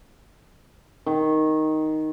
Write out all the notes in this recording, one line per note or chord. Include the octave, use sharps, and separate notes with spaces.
D#3